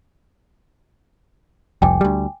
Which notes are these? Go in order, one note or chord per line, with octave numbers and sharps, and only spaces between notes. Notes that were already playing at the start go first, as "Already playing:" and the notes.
F1 C2 F2 G5 G#5 D6
D2 G3